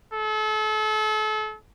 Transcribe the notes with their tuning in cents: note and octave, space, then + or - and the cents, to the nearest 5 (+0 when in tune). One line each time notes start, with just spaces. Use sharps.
A4 -35